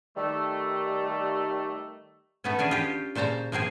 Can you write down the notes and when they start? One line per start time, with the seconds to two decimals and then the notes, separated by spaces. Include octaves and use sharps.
0.16 D#3 G3 A3
2.44 A3 B3 C#4
2.59 C#4 D4 G#4
2.71 F4 G4
3.15 A#2 C#3 C5 A5 A#5
3.52 F3 A#3 C4 G#4